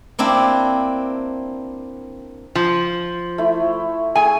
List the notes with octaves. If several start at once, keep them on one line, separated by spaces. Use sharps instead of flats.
A#3 C4 D4 E4
F3
A3 E4
A3 G#4 G#5